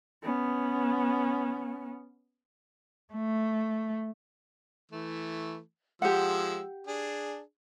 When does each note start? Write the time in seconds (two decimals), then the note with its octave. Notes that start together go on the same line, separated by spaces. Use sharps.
0.23 B3 C#4
3.14 A3
4.92 E3 A3
6.02 F3 G#3 G4 F#5 E6
6.87 D4 G#4